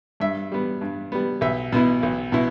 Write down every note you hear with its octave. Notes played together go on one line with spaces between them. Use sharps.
G2 E5
G3 B3
G2
G3 B3
B1 E5
B2 B3 E4
B1
B2 B3 E4